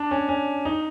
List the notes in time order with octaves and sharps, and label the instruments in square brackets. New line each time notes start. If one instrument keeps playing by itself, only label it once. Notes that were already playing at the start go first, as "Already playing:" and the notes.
Already playing: [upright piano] D4
C#4
C#4
D#4